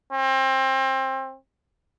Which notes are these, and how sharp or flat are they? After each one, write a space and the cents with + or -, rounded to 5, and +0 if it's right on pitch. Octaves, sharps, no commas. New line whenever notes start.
C4 +25